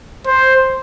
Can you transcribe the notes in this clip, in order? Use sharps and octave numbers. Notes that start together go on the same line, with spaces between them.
C5